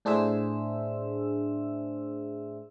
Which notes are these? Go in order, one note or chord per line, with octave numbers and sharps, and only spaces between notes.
A2 D4 G#4 C5 E5 E6